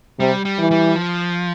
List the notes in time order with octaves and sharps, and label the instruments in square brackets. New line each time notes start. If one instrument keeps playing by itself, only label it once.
[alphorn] C3 [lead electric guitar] G3
[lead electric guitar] G3
[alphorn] E3
[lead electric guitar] G3
F3